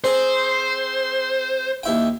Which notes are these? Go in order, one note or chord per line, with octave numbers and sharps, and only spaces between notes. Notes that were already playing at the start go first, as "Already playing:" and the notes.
C4 G#4 C5
D#2 E4 G5